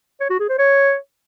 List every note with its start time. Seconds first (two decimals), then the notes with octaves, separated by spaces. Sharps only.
0.20 C#5
0.30 F#4
0.39 G#4
0.49 C5
0.59 C#5